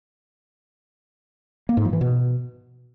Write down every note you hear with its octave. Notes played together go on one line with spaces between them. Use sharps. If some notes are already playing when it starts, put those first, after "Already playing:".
A#3
G#2
F3
E3
B2